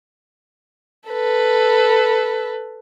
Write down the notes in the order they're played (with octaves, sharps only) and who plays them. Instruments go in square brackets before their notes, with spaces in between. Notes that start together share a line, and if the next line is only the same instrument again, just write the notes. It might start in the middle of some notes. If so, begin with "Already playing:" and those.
[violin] A4 B4